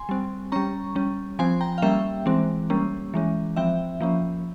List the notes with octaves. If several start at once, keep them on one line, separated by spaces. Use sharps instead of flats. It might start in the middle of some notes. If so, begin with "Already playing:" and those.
Already playing: G#5 C6
G3 C4
G3 C#4 A#5 C#6
G3 C#4
F3 C4 G#5 C6
G5 A#5
F5
G3 A#3 C#4 E5 G5
E3 G#3 C4
G3 A#3 C#4
E3 G#3 C#4
F3 C4 E5 G5
F3 A#3 C#4